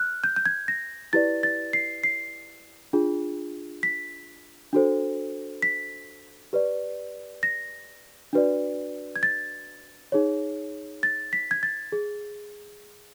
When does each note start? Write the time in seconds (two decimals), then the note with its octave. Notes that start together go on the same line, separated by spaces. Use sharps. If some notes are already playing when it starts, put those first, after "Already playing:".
Already playing: F6 F#6
0.24 G6
0.36 G6
0.46 G#6
0.68 A#6
1.13 E4 G4 B4 D5 A6
1.43 A6
1.73 C7
2.04 C7
2.93 D4 F4 G#4
3.83 B6
4.73 D4 F#4 A4 C5
5.62 B6
6.53 G4 B4 D5
7.43 A#6
8.33 D4 F#4 B4 D5
9.16 G#6
9.23 A6
10.12 D#4 G#4 C#5
11.03 A6
11.33 B6
11.51 G#6
11.63 A6
11.92 G#4